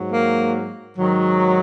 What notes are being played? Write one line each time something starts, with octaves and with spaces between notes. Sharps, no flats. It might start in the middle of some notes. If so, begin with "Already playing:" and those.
Already playing: G#2 F#3
A#3
G#2 D#3 F#3